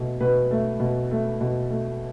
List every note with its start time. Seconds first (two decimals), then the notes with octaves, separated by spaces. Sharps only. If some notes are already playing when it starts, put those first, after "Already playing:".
Already playing: B2 A3
0.20 B2 B4
0.51 A3
0.80 B2
1.11 A3
1.41 B2
1.70 A3